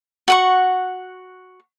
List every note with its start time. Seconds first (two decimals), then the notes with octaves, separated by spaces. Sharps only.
0.28 F#4 F#5 C#6